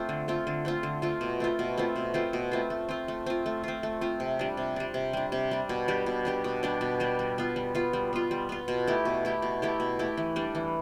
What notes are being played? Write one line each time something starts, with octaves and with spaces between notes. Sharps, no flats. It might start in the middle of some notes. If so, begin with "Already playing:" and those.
Already playing: A3 C4 F4
D3
A3 C4 F4
D3
A3 C4 F4
D3
A3 C4 F4
B2
A3 C4 F4
B2
A3 C4 F4
B2
A3 C4 F4
B2
A3 C4 F4
A3
C4 F4
A3
C4 F4
A3
C4 F4
A3
C4 F4
C3
G3 D4
C3
G3 D4
C3
G3 D4
C3
G3 D4
B2
G3 D4 G4
B2
G3 D4 G4
B2
G3 D4 G4
B2
G3 D4 G4
G3
B3 F4
G3
B3 F4
G3
B3 F4
G3
B3 F4
B2
A3 E4 G4
B2
A3 E4 G4
B2
A3 E4 G4
B2
A3 E4 G4
E3
G3 D4
E3